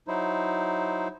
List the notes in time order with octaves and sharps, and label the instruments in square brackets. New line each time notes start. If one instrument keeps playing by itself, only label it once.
[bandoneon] F#3 D#4 E4 C5